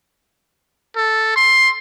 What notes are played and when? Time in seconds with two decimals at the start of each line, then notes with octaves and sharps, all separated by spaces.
0.96 A4
1.36 C6